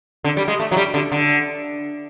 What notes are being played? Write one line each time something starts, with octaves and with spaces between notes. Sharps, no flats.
D3
G3
G#3
A3
F#3
G3
D3
D3